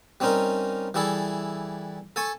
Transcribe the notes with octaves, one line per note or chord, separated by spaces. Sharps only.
G3 C4 C#4 D#4 A#4
E3 G3 E4 G#4 A4
A4 G#5 A5 C#6